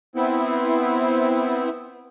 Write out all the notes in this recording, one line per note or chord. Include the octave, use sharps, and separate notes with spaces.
B3 C4 E4